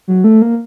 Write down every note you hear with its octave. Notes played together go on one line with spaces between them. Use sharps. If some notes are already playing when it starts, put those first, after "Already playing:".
F#3
A3
A#3